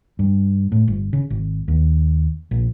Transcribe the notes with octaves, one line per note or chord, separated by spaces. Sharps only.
G2
A2
G1
C#3
G#1
D#2
A#1